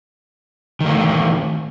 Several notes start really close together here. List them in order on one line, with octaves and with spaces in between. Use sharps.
D#3 A3 E3